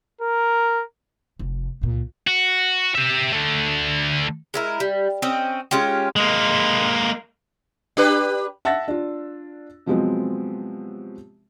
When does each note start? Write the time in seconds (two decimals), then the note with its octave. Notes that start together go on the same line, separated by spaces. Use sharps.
0.21 A#4
1.39 F1
1.81 C#2 A#2
2.27 F#4
2.95 G4 E5
3.32 D3 A3
4.54 G#3 E4 A#4
4.80 G3
5.22 C4 C#4 D#5
5.71 G#3 C#4 F4 G4
6.16 G#3 A#3
7.97 D4 G4 B4
8.65 E5 F#5 A5 E6 A6 A#6
8.88 D4 F4
9.86 C3 F3 F#3 G#3 B3 C4